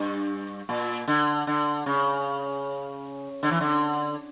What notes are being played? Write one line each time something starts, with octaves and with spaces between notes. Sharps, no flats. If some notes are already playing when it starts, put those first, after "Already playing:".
Already playing: G2
A#2
D3
D3
C#3
D3
E3
D3